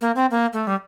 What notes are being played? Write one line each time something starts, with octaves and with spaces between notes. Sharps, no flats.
A#3
C4
A#3
A3
G3